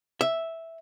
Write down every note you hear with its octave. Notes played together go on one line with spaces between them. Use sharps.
E5